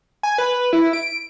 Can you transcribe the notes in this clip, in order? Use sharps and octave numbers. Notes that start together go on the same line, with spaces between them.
G#5
B4
E4
D7